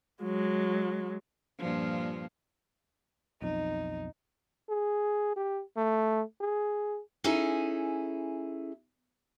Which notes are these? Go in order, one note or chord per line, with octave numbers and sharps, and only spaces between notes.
F#3 G#3
G2 A#2 F3
B1 F2 D#4
G#4
G4
A3
G#4
C#4 D#4 E4 G#4 A4 G#5